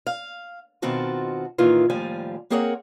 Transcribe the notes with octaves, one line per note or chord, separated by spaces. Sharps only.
F5
B2 D#3 C4 F4 F#4 A5
A#2 D#3 E3 F4
D#2 A2 F3 G3 F5 G#5
A#3 C4 G#4 A#4 C#5 F#5